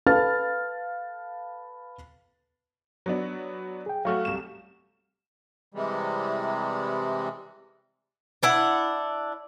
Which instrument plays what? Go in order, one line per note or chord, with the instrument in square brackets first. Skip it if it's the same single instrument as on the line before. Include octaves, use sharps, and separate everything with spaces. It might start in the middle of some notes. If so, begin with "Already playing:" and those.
[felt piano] A4 B4 F5 A5 F6 A6
[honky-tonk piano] F#3 B3 D4
[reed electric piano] G#4 G5
[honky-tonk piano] F#3 A3 F#4 [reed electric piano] F5 C#6 F6
[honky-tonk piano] C2 E7
[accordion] C3 E3 G3 G#3
[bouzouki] D4 E4 F#5